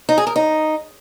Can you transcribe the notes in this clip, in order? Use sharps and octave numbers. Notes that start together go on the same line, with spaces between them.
D#4
G#4
A#4
D#4